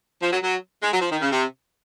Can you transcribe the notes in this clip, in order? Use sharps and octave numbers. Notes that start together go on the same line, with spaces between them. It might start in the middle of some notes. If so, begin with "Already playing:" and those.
F3
F#3
F#3
G#3
F#3
F3
D#3
C#3
C3